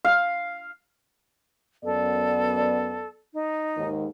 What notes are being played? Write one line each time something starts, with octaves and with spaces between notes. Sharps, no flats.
F5
F#2 B3 A4 D5
D#4
D#2 G#2 D#3